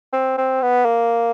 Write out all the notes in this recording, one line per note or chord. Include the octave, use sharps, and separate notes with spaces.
C4
C4
B3
A#3